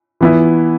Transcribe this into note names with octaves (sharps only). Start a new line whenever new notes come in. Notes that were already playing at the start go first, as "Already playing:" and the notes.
E3 B3 E4